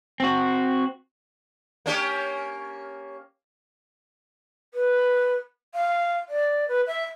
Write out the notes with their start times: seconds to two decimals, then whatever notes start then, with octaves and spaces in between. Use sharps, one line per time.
0.20 C4 F#4
1.86 A#3 C#4 G4
4.74 B4
5.74 F5
6.29 D5
6.68 B4
6.87 E5